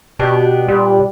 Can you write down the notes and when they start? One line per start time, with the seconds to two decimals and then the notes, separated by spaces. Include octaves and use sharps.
0.19 B2 B3 D4 G4
0.68 A#2 G3